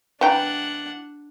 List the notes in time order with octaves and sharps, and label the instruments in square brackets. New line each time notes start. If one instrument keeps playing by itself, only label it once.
[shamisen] E3 G5 A#5 [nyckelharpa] D4 F#5